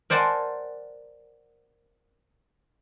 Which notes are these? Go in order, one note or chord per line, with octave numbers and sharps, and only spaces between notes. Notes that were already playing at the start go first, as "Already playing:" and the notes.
A#4 C5 D5 F#5 G#5 A5